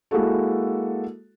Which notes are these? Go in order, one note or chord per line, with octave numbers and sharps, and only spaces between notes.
G#3 A#3 E4 F#4 A4